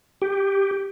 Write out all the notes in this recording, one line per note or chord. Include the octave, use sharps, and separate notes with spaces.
G4